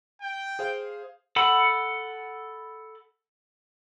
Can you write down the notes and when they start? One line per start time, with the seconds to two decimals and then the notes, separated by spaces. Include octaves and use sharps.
0.22 G5
0.59 G#4 C5 F5
1.36 A4 F#5 B5